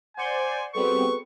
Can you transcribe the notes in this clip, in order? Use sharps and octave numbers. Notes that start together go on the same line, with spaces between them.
C5 D5 F#5 G#5 C#7 G7
G3 B3 C4 F#4 G#4 A4 B4 C#6